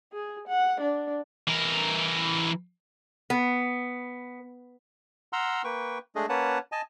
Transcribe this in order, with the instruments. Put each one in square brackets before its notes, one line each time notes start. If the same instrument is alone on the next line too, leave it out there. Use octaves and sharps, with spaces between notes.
[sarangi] G#4
F#5
D4
[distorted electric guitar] E3 A#4
[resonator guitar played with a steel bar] B3
[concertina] F#5 A#5 C6 E6 F6
A#3 B4 G5 C#6
G#3 A3 D4 G#4 D#5
A#3 C#4 B4 C#5 F#5 A5
D#5 G#5 A5